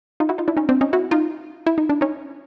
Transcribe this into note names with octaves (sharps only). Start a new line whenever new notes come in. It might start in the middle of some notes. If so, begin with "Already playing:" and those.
D#4 F4
E4 F#4
D#4 F4
D4 E4
C#4 D#4
C4 D4
C#4 D#4
E4 F#4
D#4 F4
E4
D#4
D4
C#4 D#4